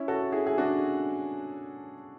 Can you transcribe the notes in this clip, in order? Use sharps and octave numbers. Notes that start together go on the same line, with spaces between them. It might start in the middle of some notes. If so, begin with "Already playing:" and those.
Already playing: C#4 E4
F#4 A4
E4 G#4
G#4
D4 F#4